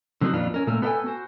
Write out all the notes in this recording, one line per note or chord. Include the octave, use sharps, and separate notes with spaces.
D3 F#3 C4 C#4 D#4 F#4
F2 A#2 D#3 B3 D4 F4
C#4 A#4
A#2 A3 A#3 A#4
B3 A4 B4 E5 G5 G#5
F#4 C5